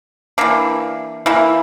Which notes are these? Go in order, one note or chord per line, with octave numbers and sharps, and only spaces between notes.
E3 A#3 D4
E3 A#3 E4